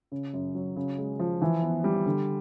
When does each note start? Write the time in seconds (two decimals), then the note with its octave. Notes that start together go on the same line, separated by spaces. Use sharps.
0.12 C#3
0.34 F#2
0.55 F#3
0.76 C#3
0.98 G#3
1.19 F3
1.42 E3
1.62 B3
1.84 G3
2.06 D3